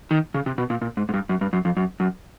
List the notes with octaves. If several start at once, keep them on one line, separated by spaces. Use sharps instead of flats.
D#3
C#3
C3
B2
A#2
A#2
G#2
G#2
G2
F#2
G2
F#2
F2
F#2
F#2